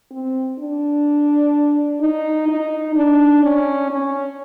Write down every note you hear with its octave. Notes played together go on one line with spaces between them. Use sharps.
C4
D4
D#4
D#4
D4
C#4
C#4